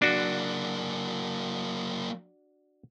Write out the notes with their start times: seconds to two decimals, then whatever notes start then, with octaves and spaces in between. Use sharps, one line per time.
0.02 F#3 A#3 D4 F#4